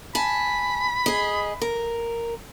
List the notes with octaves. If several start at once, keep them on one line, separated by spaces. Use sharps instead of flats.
G#5 A5 B5
G#4 D#5
A#4